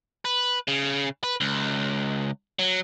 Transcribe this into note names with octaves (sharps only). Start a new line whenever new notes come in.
B4
C#3
B4
C#2
F#3